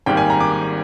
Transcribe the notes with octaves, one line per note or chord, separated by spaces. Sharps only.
G#1 G#2 G3 A#3 G5
G#5
A#5
D6
D6